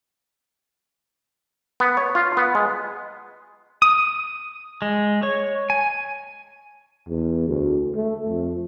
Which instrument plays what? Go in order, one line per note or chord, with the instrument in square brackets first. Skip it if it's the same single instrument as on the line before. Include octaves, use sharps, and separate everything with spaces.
[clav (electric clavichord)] B3
C#5
F4
B3
G#3
[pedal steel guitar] D#6
G#3
C#5
G#5
[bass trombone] E2
D2
A3
F2